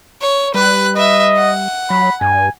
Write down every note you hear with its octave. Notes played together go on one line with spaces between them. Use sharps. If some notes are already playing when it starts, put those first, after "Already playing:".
C#5
G3 B4 F#6
B4 D#5 E5
F#5
F#3 B5
G2 G#5